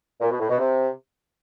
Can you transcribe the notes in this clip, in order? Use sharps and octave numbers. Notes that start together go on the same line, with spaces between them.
A#2
B2
A2
B2
C3